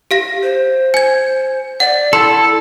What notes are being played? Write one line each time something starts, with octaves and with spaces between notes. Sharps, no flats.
G4 F5 A#6
C5
G#5 G#6
D5 F#5
E4 A4 C6